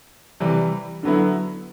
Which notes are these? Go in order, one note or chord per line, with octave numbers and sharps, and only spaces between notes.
C3 E3 G3
D3 F#3 B3 E4